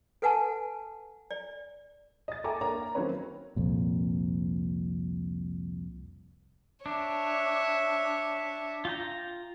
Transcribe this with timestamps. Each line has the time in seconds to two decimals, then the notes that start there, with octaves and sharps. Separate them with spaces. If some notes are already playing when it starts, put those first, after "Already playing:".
0.22 A4 B4 F#5 G#5 A5
1.31 D5
2.28 D#5 A6
2.44 A4 E5 G5 G#5 A#5 D6
2.61 A#3 D4 A#4 C#5 A#5
2.95 D#3 F#3 A#3 C4 C#4 B4
3.56 C2 F2 A#2
6.86 D4 C#5 E5
8.85 F4 G5 A#5